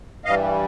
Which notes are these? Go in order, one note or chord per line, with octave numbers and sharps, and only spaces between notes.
G2 E3 G3 D#5 F5